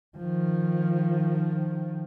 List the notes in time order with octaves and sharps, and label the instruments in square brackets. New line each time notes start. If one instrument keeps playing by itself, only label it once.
[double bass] D#3 F3